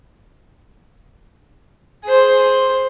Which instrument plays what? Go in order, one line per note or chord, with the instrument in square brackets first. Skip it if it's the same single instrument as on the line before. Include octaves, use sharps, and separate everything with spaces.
[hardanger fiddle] G#4 C5